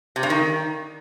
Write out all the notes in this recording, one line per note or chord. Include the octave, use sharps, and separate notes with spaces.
C3
G2
D#3